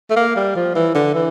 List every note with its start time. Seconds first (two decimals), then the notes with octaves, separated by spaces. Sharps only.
0.10 A3
0.16 A#3
0.36 G3
0.56 F3
0.76 E3
0.95 D3
1.15 E3